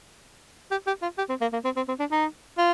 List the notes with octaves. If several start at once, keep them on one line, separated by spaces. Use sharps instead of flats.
G4
G4
F4
G4
C4
A#3
A#3
C4
C4
C4
D4
D#4
F4